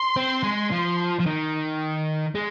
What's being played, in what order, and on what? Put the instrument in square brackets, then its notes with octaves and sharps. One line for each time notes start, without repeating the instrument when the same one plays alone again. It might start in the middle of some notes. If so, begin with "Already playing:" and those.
Already playing: [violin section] C6
[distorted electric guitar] C4
G#3
F3
F3
D#3
G#3